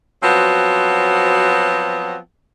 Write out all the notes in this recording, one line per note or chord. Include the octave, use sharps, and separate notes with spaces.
F3 F#3 B3 C4 F#4